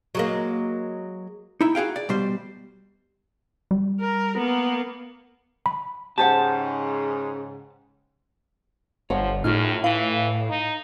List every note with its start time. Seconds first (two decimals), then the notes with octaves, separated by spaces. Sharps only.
0.15 F#3 G#3 A#3
1.61 D#4 E4
1.75 F#4 G#4 F5 G5
1.96 D5
2.09 B2 G3 C5
3.71 G3
4.01 A#4
4.37 A#3 B3
5.66 B5
6.18 G#2 C#3 G4 C5 F#5 A5
9.10 G1 F3 C#5 F#5
9.44 F#2 A2 D#4 F4 G#4 F6
9.84 E3 E4 F5
10.50 D#4